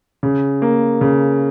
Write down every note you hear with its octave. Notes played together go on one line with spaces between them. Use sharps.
C#3
A#3
C#3